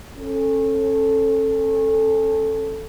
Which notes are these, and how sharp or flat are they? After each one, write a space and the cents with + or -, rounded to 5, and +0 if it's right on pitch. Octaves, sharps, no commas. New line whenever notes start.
C#4 -30 A4 +0